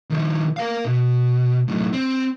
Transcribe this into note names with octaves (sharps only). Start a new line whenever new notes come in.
D#3 F3
A#4 F5
B2
F#2 A2
C4